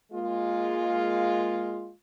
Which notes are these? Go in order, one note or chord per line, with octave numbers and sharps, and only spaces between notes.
G#3 A#3 F4